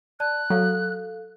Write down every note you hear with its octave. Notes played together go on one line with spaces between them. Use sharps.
D5 A5 F#6
F#3 A4 F5